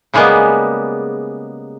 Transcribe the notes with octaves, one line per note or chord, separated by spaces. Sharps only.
C#3 G3 G#3 A#3 B3